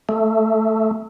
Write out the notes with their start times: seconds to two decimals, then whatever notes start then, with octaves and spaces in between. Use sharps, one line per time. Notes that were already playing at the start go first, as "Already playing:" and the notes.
0.09 A3